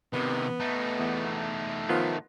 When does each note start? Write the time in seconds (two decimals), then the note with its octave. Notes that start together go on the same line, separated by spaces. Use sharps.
0.13 C3 D#3 B3
0.60 A3 D#4
0.99 E2
1.89 D#3 F3 B3 F4